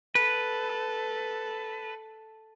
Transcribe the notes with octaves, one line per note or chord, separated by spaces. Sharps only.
A4 B4